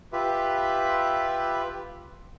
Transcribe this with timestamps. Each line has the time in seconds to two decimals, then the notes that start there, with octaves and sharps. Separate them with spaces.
0.13 F4 G4 B4 E5